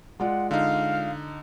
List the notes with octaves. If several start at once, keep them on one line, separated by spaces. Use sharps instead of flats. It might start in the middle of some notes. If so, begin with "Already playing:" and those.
G#3 F4 D5 F#5
D3 D#4 F5